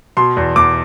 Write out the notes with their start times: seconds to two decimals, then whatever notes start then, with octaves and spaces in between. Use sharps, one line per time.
0.17 B2 C6
0.37 E2
0.56 E2 D6